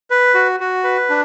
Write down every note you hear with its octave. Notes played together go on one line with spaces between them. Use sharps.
B4
F#4
F#4
B4
D4